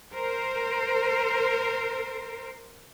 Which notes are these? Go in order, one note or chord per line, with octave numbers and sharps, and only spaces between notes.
A#4 C5